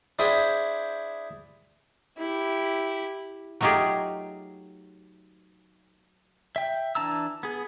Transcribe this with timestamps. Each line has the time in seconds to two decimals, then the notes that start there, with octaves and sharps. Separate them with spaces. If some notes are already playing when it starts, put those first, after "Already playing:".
0.19 D4 E4 G#4 C5 G5
2.18 E4 G4
3.61 F#3 A3 D#4 F4 G4 G#4
6.56 E5 G5
6.95 E3 D4 A5 A#5 E6
7.43 B3 G#4